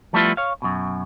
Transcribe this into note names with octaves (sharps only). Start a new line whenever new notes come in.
F3 G3 A3 B3 E4 F4
C#5 F5
F#2 B2